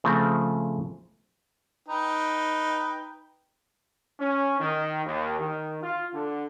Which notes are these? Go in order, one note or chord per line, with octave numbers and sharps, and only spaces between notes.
C#3 F3 A3 C4
D#4 B4 G5
C#4
D#3
D#2
D#3
F4
D3